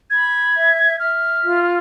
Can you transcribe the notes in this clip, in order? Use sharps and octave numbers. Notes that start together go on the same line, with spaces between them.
B5 G#6
E5
E5 F6
F4